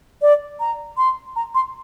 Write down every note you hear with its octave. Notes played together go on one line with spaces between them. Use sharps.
D5
A#5
C6
A#5
C6